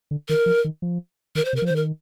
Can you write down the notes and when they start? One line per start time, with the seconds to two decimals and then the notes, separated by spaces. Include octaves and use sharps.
0.11 D3
0.29 D#3 A#4
0.46 F3
0.64 D#3
0.82 F3
1.35 D#3 A#4
1.45 C5
1.53 C3
1.56 A#4
1.62 F3
1.66 D#3 C5
1.76 A#4